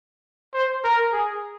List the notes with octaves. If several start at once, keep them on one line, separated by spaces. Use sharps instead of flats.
C5
A#4
G#4